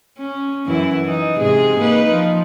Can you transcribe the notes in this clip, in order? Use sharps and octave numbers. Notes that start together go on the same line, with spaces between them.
C#4
F#2 E3 E4
E3 D#4
G#2 C3 G#4
A#3 D#4 B4
F3